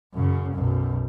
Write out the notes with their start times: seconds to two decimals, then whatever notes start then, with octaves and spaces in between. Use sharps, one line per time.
0.13 F#2 C#3
0.54 B1 F#2